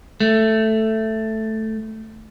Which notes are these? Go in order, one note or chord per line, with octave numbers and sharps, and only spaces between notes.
A3